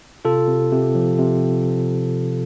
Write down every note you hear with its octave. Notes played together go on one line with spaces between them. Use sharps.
C3 F4 A4
C3
C3
F3
C3